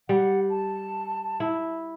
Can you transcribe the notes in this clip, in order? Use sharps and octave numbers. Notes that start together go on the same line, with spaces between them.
G3 F#5
A5
E4